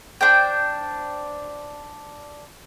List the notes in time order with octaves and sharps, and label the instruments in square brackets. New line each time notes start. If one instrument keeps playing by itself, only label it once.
[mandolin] D4 C5 G5